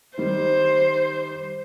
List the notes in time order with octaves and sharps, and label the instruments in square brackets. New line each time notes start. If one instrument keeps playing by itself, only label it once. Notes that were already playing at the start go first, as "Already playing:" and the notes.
[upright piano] D#3 G3 [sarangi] C5